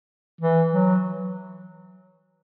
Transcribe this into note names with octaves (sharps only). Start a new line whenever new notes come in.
E3
F#3